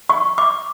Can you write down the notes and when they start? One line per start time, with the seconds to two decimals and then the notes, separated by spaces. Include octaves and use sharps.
0.09 C#6
0.38 D6